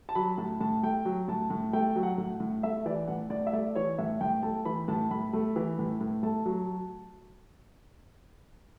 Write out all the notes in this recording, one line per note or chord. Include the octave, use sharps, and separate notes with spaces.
A5
F#3 B5
A2 A5
A2 A5
A3 G5
F#3
A2 A5
A2
A3 G5
F#3
F#5
A2
A2
A3 E5
E3 D5
A2 F#5
A2 D5
E5
A3 D5
E3 C#5
A2 E5
A2 G5
A3 A5
E3 B5
A2 A5
A2 B5
A3
E3
A2
A2
A3 A5
F#3